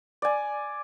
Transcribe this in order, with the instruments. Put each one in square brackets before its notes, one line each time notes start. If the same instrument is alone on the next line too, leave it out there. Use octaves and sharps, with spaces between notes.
[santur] D5 G#5